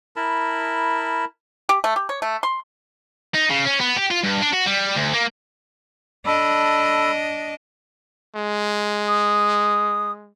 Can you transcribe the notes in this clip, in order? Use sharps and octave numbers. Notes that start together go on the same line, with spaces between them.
E4 A#4 A5 B5
G4
A3
G4
C#5
A3
C6
D#4
C#3
C#4
B3
G4
F4
G2
D4
F#4
G3
D2
A#3
D4 A4 D#5 B5
G#3
D#6